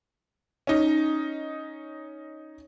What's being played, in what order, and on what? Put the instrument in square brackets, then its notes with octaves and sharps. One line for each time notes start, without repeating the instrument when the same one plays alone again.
[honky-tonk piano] C#4 D#4